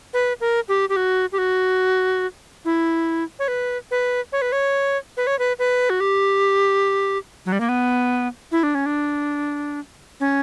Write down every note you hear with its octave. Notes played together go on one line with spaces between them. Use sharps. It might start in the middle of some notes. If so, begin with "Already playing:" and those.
B4
A#4
G4
G4
F#4
G4
F#4
E4
C#5
B4
B4
C#5
B4
C#5
B4
C#5
B4
B4
F#4
G4
F#3
G3
A#3
B3
E4
D4
C#4
D4
C#4